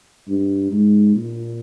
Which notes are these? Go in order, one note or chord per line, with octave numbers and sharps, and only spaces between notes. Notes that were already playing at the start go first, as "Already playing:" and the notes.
G2
G#2
A#2